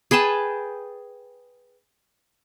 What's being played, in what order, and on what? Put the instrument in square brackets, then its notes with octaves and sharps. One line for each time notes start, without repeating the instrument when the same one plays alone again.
[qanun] G#4 B4 G5 A5